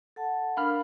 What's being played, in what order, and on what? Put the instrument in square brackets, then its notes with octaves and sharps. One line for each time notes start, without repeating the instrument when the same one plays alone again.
[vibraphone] A4 F#5 A5
[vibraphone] D4 A#4 [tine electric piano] F5 B5 F6